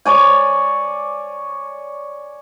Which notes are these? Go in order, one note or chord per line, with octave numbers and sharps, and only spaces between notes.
C#5 D5 G#5